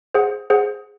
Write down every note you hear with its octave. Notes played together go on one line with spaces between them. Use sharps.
G#4 C5 F#5
G#4 C5 F#5